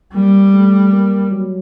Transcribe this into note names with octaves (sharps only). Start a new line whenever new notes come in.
G3 A#3
A3
A#3
F#3